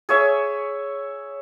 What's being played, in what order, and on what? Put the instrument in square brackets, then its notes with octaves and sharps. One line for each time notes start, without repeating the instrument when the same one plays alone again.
[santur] G#4 C#5 E5